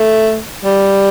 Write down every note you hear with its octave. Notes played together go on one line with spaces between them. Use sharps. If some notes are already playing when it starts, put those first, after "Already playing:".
Already playing: A3
G3